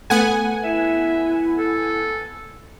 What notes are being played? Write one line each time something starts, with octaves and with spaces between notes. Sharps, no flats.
A3 B3 F#5 G#5
E4 E5
A4